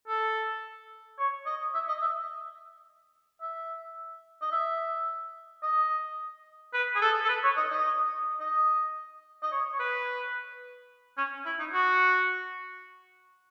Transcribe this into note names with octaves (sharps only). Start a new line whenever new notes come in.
A4
C#5
D#5
E5
D#5
E5
E5
D#5
E5
D#5
B4
G#4
A4
A4
B4
C#5
D#5
D#5
D#5
D#5
C#5
C#5
B4
C#4
E4
D#4
F#4